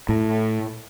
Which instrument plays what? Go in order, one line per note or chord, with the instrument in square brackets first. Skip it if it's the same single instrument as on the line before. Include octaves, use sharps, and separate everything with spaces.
[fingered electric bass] A2